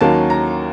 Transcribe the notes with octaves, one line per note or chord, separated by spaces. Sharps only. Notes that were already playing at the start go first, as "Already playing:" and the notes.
D#2 D#3 F#3 A#3 C#4 A5
A#5